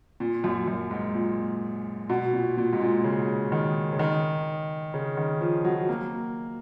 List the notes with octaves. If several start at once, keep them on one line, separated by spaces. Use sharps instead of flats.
A#2
F#2
F#2
G#2
A#2
B2
A#2
A#2
G#2
A#2
C#3
D#3
C#3
D#3
C#3
D#3
F3
F#3
A#3